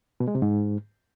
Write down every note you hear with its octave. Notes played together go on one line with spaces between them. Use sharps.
B2
G#3
C3
G#2